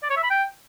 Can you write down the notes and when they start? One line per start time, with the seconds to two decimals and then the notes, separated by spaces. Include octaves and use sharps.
0.03 D5
0.10 C#5
0.17 E5
0.24 B5
0.31 G5